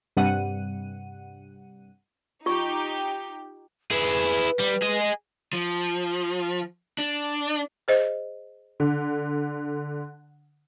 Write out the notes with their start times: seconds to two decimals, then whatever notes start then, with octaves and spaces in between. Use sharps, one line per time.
0.17 G2 C3 G3 F#5 D#7
2.46 D#4 F4 G4 C#6
3.91 E4 G#4 B4
4.60 G3
4.83 G#4 D#5
5.53 F3
6.98 D4
7.88 G#4 C5 D#5
8.80 D3